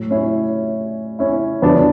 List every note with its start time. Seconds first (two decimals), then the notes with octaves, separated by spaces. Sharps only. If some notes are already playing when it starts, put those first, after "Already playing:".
Already playing: A2 F#3
0.10 C#4 E4
1.19 C#4 E4
1.62 E2 D3 F#3 B3 D4